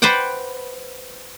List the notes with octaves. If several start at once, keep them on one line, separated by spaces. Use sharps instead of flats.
B4 C5 D5 F#5 G5